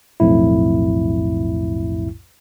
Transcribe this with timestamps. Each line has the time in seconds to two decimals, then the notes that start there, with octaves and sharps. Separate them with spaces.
0.20 B1 F2 A2 E4